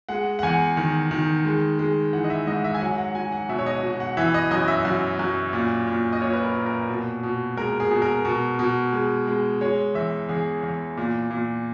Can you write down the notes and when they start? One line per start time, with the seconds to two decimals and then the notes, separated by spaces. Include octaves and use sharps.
0.09 G#3 F#5
0.39 F#5
0.43 E2 G#5
0.77 D#3
1.11 D#3
1.45 G#3
1.79 G#3
2.13 E3 F#5
2.24 D#5
2.30 E5
2.47 G#2 D#5
2.64 E5
2.75 G#5
2.81 F#3 F#5
2.98 F#5
3.15 F#3 G#5
3.32 F#5
3.49 B2 E5
3.59 C#5
3.66 D#5
3.83 B2
4.00 F#5
4.17 E3 E5
4.34 D#5
4.51 F#2 D#5
4.68 E5
4.85 F#2
5.19 F#2
5.53 A#2
5.87 A#2
6.12 D#5
6.21 A#2 C#5
6.33 B4
6.43 A#4
6.55 A#2
6.66 A#4
6.89 B2
7.23 B2
7.57 G#3 A#4
7.80 G#4
7.91 B2
8.02 A#4
8.25 B2
8.59 B2
8.93 G#3
9.27 G#3
9.61 G#3 C#5
9.94 E2 E5
10.29 E2 G#4
10.62 E2
10.97 A#2
11.31 A#2